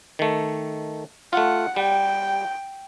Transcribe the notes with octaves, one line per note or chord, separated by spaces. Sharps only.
D#3 A3
A3 F4 F#5
G3 G5